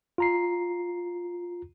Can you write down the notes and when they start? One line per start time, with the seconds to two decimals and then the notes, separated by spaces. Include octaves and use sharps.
0.18 F4 A#5 C7